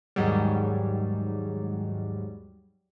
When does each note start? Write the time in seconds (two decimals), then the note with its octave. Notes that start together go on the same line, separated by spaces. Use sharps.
0.16 D#2 G#2 F#3 G3